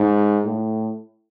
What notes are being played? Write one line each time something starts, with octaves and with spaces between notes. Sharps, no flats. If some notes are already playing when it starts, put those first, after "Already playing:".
Already playing: G#2
A2